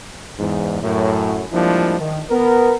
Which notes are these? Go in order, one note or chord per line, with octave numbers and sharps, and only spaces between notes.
E2 G#2
F#2 A2
F3 G3 G#3 A#3 D4 E4
D#3
B3 A#4